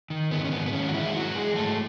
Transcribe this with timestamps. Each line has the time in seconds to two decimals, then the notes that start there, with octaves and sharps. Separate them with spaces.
0.10 D#3
0.31 G#2 B3
0.45 C#4
0.51 G#2 B3
0.66 B3
0.73 D#3 C#4
0.88 F#4
0.93 E3 G#3 E4
1.14 G#2 F#3 F#4
1.35 E3 G#3 G#4
1.56 G#2 A3 A4